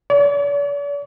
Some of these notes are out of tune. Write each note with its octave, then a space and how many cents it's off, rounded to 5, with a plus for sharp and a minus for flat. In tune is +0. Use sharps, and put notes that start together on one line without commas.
D5 -45